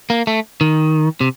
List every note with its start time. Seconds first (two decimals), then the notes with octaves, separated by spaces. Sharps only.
0.10 A#3
0.27 A3
0.61 D#3
1.21 C3